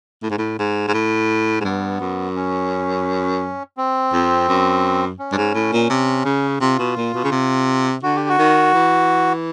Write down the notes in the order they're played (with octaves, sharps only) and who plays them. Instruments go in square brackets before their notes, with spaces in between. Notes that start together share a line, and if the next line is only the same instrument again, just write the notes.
[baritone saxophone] A2
G#2
A2
G#2
G#2
A2
G#2
[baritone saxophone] G2 [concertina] B3
[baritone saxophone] F#2
[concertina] C#4
C4
[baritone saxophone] F2
F#2
[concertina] C#4
[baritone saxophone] G2
G#2
A2
A#2
C3
C#3
[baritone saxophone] C3 [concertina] F4
[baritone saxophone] B2
A#2
B2
C#3
C3
[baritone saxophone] D3 [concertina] F#4
[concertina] G4
F#4
[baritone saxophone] D#3
E3